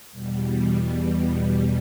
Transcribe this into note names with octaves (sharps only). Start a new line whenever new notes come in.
E2 B2 G3